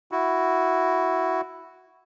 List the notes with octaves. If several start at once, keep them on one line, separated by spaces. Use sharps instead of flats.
E4 F#4